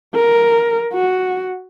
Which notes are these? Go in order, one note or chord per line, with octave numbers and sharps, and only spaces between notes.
A#4
F#4